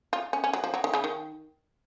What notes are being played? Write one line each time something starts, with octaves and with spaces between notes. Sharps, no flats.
F4
C#4
C#4
F#3
F3
F#3
D#3
C#3
D#3